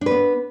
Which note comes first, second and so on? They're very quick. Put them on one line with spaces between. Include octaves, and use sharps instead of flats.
D4 B4 B3